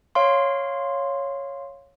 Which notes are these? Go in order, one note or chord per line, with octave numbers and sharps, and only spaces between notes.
C#5 F5 C6